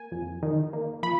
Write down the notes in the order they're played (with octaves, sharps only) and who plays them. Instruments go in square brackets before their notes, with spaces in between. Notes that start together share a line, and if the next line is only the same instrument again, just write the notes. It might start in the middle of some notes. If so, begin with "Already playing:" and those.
Already playing: [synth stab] A#3 G#5
F2
D#3
A#3
F3 B5